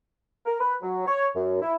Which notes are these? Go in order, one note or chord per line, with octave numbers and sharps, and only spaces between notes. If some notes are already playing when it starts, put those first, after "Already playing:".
A#4
B4
F#3
C#5
F#2
E4